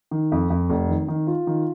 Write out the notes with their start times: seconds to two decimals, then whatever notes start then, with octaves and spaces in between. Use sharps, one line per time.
0.11 D#3
0.32 F2
0.50 F2
0.70 F1
0.88 D#3
1.08 D#3
1.27 F4
1.47 D#3